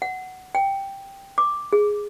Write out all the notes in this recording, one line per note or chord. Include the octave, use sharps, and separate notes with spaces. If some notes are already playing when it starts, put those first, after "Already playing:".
F#5
G5
D6
G#4